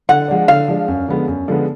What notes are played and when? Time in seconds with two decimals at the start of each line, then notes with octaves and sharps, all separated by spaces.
0.09 D3 F#5
0.28 F3 G#3 D4
0.48 D3 F5
0.68 F3 G#3 D4
0.88 F#2
1.08 D3 F3 G#3 B3
1.28 F#2
1.48 D3 F3 G#3 B3